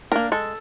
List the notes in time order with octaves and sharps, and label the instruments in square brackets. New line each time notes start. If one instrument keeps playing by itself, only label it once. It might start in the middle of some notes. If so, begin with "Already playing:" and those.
[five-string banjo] A#3 D4 A#4
G#3 A4